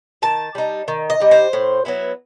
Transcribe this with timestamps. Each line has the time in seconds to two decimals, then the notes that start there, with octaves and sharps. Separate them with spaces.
0.22 D#3 A5
0.55 G3 D#4
0.88 D#3
1.10 D#5
1.20 G3 D#4
1.31 C5
1.53 A2
1.85 F#3 B3 E4